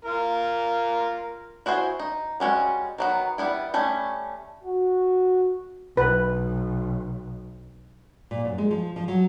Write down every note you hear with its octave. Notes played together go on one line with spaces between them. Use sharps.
F4 A#4
E4 F#4 G#4 C5
D#4
G3 G#3 C#4 F#4
D#3 F#3 B3
G3 B3 E4
G3 A3 C#4
F#4
B1 B4
A#2
F#2
G#3
F3
F3
F#3